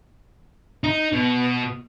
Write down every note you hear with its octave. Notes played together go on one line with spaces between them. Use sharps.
D#4
B2